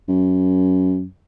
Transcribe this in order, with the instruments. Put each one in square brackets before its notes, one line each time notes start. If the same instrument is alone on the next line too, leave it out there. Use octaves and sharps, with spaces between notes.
[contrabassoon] F#2